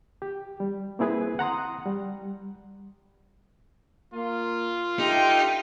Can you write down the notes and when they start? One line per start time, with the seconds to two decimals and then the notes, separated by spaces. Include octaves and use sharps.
0.22 G4
0.60 G3
0.99 A#3 C4 E4 G#4 B4
1.39 F#5 A#5 C6 D#6
1.86 G3
4.14 A#3 F4
4.99 D#4 G4 A4 E5 G5